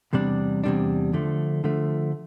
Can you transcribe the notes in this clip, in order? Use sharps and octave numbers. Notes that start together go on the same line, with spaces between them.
E2 C3 G3 D4
E2 C3 G3 D4
D3 F3 A3
D3 F3 A3